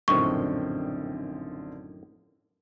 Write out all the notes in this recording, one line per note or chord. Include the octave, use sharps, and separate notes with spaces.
A#1 F#2 A2 D3 D#3 C4 C#6